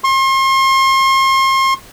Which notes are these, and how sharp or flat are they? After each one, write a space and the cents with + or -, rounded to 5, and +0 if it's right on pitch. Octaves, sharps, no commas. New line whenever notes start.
C6 +40